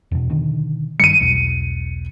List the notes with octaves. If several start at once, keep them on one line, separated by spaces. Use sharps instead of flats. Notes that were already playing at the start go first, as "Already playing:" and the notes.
E2 B2
B2 D3 D#3
G2 D#3 G3 C#7 D#7
B1 E2 B2